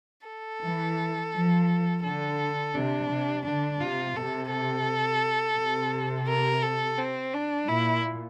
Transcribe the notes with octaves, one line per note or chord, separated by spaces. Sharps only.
A4
E3
F3
D3 A4
C3 D4
C3
D3 D4
C3 F4
C3 A4
A4
C3
A#4
A4
C4
D4
A#2 E4